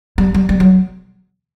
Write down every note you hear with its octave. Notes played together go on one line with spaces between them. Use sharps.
G3
G3
G3
F#3